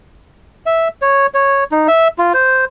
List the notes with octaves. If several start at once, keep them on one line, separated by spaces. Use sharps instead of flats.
E5
C#5
C#5
D#4
E5
F4
C5